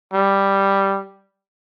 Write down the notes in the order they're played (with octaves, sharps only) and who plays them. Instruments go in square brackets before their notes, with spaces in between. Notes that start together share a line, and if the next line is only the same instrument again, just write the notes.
[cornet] G3